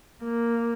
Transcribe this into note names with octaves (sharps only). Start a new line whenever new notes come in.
A#3